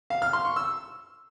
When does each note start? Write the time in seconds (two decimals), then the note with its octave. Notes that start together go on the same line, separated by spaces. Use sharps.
0.10 F5
0.22 F6
0.33 C6
0.45 C#6
0.56 E6